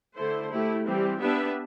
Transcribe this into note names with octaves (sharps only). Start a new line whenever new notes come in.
D3 A3 E4 A4 C5
A3 E4 G4
E3 G3 C4 G4
B3 D4 G4 B4 E5